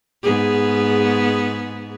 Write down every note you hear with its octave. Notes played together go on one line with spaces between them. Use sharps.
G#2 B3 G#4